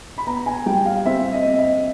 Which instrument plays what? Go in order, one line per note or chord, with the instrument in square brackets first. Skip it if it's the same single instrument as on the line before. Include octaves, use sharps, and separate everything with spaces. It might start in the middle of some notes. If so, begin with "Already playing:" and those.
[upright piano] B5
B3 A#5
G#5
G3 G5
F5
C4 E5
D#5
C4
D#5
E5